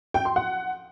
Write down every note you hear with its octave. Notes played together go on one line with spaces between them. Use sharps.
G5
C6
F#5